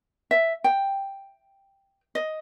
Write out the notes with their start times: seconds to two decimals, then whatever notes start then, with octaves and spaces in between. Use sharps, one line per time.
0.31 E5
0.64 G5
2.15 D#5